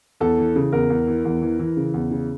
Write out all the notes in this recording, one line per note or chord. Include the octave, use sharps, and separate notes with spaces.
E2 A4
E3
C#3
E2 A#4
E2
E3
E2
E3
E3
C#3
E2
C#3